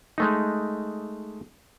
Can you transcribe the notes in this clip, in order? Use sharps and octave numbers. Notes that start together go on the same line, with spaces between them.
G#3 A3 D#4